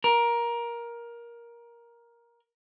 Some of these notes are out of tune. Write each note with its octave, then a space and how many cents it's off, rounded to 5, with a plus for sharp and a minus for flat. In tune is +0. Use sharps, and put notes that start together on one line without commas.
A#4 +15